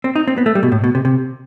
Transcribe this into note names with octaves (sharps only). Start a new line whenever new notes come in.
C4
D#4
C4
B3
A3
G3
B2
A2
B2
C3
C3